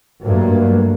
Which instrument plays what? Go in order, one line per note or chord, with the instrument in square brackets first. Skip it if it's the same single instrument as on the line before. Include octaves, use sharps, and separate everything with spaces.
[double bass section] G2 F#3 A3 A#3